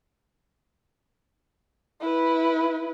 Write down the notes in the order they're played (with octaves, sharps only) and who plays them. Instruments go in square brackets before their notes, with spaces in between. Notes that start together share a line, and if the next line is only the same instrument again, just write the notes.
[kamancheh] E4 B4